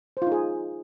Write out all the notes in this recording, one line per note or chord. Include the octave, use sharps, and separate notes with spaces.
D#4 F4 G#4 C5